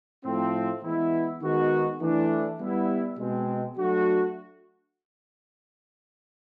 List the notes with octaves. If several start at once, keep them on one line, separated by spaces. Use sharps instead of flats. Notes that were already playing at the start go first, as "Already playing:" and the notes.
A2 F3 A3 C4
E3 G#3 B3 E4
D#3 G#3 B3 D#4 F#4
E3 A3 D4
G3 B3 E4
B2 G#3 C4
F#3 A3 D4 F#4